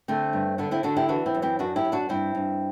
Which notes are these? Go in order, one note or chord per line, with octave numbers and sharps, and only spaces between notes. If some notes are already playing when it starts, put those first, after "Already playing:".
D3 A3 C4
G2
D3 B3 D4
C4 E4
D3 D4 F#4
E4 G4
E3 D4 F#4
C4 E4
F#2
C4 E4
F#2 D4 F#4
E4 G4
F#2
D4 F#4
G2 C4 E4
G2